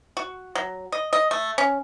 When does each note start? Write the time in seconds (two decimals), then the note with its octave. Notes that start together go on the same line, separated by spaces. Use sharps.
0.17 F#4
0.55 F#3
0.92 D#5
1.13 D#5
1.31 A3
1.58 C#4